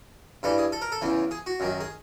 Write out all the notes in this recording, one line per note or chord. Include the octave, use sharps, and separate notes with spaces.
G2 E3 G3 A4
G#4
A4
A#4
A4
E2 C#3 E3
G#4
F#4
F#2 D#3 F#3
G#4